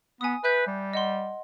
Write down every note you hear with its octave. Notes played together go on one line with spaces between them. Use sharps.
B3 G#5 D#6
B4 E5 F#6 G6
G3
D#5 F#5 C6